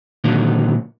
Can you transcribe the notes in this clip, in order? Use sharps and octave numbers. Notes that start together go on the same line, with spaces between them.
A#2 D3 D#3 F#3